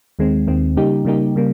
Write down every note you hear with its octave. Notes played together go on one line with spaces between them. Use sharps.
D#2 D#3 G#3 C4
D#2 D#3 G#3 C4
C#3 G3 A#3 D#4 G4
C#3 G3 A#3 D#4 G4
C#3 G3 A#3